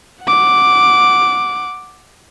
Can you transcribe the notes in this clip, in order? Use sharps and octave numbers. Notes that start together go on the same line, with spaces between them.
F#5 D6